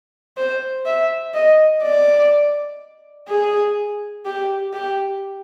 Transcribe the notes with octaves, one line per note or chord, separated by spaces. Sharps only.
C5
E5
D#5
D5
G#4
G4
G4